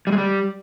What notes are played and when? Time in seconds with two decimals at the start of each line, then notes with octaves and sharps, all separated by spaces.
0.07 G3
0.12 G#3
0.18 G3